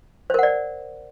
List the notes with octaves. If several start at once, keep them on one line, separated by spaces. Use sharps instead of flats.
A#4 C5 D5 F#5